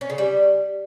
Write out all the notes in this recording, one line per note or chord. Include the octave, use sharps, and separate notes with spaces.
C#4
C#3
G3